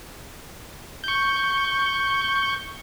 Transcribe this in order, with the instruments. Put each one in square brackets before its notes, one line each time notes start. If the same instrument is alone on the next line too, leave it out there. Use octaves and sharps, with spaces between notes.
[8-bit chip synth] C#6 G6